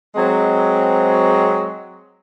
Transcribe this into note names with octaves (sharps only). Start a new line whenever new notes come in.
F#3 G#3 C4